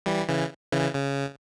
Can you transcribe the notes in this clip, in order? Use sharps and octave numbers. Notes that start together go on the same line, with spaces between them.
E3 G3
C#3 E3
C#3 E3
C#3